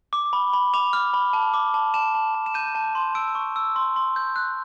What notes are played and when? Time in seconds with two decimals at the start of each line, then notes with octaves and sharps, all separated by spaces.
0.13 D6
0.33 B5
0.53 B5
0.74 D6 F7
0.93 F6
1.14 B5
1.33 A5
1.54 D6
1.74 A5
1.94 A5 E7
2.14 A5
2.35 A5
2.46 E7
2.54 G6 D#7
2.75 A5
2.95 C6
3.15 E6 D7
3.35 C#6
3.56 E6
3.76 C6
3.96 C6
4.16 G6
4.36 F#6